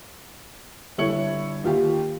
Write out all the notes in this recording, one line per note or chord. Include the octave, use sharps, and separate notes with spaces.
G1 E4 A4 C#5 C#7 F#7
D#2 F4 G4